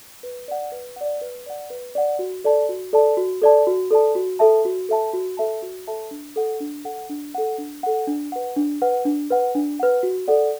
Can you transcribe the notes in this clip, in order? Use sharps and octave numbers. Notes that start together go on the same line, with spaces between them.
B4
D5 F#5
B4
D5 F#5
B4
D5 F#5
B4
D5 F#5
F#4
A4 D5 A5
F#4
A4 D5 A5
F#4
A4 D5 A5
F#4
A4 D5 A5
F#4
A4 E5 A5
F#4
A4 E5 A5
F#4
A4 E5 A5
F#4
A4 E5 A5
D4
A4 F#5
D4
A4 F#5
D4
A4 F#5
D4
A4 F#5
D4
B4 F#5
D4
B4 F#5
D4
B4 F#5
D4
B4 F#5
F#4
A4 D5 F#5